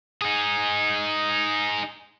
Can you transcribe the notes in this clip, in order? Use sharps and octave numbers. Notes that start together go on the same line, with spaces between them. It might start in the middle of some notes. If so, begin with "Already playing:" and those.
D#4 G#4